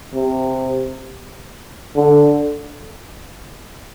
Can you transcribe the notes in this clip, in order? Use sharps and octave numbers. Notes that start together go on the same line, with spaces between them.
C3
D3